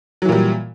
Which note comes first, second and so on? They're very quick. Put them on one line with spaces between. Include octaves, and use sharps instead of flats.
F#3 E3 A#2 G3